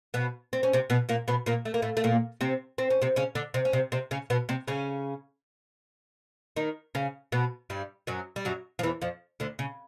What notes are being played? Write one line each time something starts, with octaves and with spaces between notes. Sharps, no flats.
B2 B3
C4
C#4
C3 C4
B2 B3
A#2 A#3
B2 B3
A#2 A#3
A3
A#3
A2 A3
A3
A#2 A#3
C3 C4
C4
C#4
C3 C4
C#3 C#4
D3 D4
C3 C4
C#4
C3 C4
C3 C4
C#3 C#4
B2 B3
C3 C4
C#3 C#4
D#3 D#4
C#3 C#4
B2 B3
G2 G3
F#2 F#3
G3
F#2 F#3
F3
E2 E3
F2 F3
D2 D3
C#3